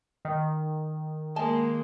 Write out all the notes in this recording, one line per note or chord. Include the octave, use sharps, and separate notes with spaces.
D#3
G#3 A#3 D#5 G#5 A5